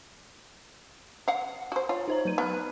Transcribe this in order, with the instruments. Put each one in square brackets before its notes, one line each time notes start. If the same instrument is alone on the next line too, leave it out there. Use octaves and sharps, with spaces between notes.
[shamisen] F5 F#5
F#4 C5
[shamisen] F4 [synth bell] C#5
[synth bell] D#4 C5 A#5
F#3 B4 D#7
[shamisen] B3 [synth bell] F6 F#6